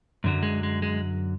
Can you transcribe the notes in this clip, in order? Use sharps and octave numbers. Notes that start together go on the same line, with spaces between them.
F#2 D3 F#3
G#3
G#3
G#3